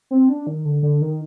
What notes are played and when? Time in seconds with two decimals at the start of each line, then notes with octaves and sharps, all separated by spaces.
0.11 C4
0.29 D4
0.47 D#3
0.65 D3
0.83 D3
1.02 D#3